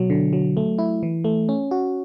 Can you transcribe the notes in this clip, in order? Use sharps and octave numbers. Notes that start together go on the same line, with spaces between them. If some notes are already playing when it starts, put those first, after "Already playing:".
Already playing: B2 F#3
D3
F#3
A3
E4
E3
A3
C#4
F#4